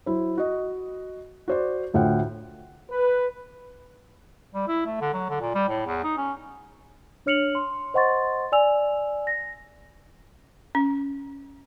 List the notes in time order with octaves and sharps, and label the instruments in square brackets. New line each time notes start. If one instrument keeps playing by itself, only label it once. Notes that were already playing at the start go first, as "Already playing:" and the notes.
[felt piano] F#3 E4 C5
F#4 D#5
F#4 C5 D5
D2 A2 F4 F#5 G5
[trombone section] B4
[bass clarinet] G3
E4
A3
D3
F#3
D3
A#2
G3
A2
E2
D#4
C#4
[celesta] D4 C#5 F6 C#7 F7 F#7
C6
C5 D#5 F#5 C6 C#6 A6
D5 G#5 E6 F7
A#6
[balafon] C#4